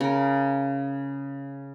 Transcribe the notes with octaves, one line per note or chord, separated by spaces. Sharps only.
C#3 A#4